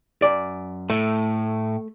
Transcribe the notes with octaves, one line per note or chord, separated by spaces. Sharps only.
F#2 D5
A2 A3